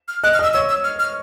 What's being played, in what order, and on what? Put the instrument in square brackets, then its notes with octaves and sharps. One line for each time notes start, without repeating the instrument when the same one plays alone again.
[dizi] F6
[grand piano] D#5 [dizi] F#6
[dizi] F6
[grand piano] D#5 [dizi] E6
[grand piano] C#5 [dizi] E6
[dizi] E6
F6
F6